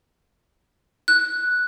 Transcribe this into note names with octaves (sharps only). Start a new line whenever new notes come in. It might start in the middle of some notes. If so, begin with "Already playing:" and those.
F#6